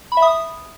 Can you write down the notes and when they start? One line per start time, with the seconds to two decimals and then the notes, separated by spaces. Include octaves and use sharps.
0.12 B5
0.17 E5
0.22 D#6